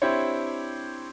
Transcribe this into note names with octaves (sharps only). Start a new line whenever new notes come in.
C4 D4 E4 G4 C5 C#5